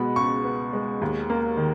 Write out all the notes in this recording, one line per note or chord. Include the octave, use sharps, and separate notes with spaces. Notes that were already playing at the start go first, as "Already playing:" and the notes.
Already playing: B2 G#3 B3 B5
C#2 C#6
B3
G#3
D#2
A#3
D#3